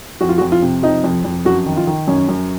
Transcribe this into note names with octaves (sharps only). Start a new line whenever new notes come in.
F2 F#4
F4
F#4
F2
F4
C3
F3 D#4
F2
F2
F#2 F#4
D#3
F4
D#3
F#2 C#4
F#2